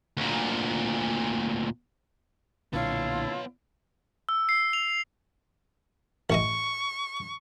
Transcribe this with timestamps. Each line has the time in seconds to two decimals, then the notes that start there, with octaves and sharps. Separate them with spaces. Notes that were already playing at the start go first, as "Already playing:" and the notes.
0.17 D2 A#2
2.73 B1 A#2 D3 B3 E4 F4 C#5 A5
4.29 E6
4.49 C7
4.73 F7
6.30 A1 A3 D#5 C#6